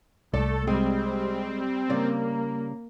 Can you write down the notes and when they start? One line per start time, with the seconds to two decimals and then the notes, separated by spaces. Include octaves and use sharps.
0.34 C2 A3 A4 D5
0.67 G3 G#3 C4
1.90 C#3 G3 A#3 D5